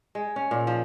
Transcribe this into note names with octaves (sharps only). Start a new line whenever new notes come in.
G#3
C#4
A#2
F3